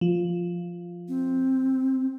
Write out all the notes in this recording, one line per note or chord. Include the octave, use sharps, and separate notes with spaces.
F3
C4